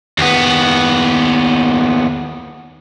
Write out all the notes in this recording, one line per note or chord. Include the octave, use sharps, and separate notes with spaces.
D#2 B3